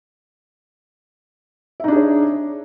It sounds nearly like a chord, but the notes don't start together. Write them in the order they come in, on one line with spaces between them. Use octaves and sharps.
E5 D#4 D4 G#4 C#5